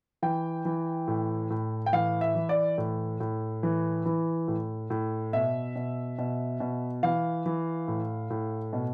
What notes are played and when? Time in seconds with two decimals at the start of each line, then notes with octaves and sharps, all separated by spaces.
0.22 E3 G5
0.65 E3
1.08 A2
1.50 A2
1.86 G5
1.93 E3 F5
2.21 E5
2.35 E3
2.49 D5
2.78 A2
3.20 A2
3.63 E3
4.05 E3
4.48 A2
4.90 A2
5.33 B2 E5
5.75 B2
6.18 B2
6.60 B2
7.03 E3 F5
7.46 E3
7.88 A2
8.30 A2
8.73 B2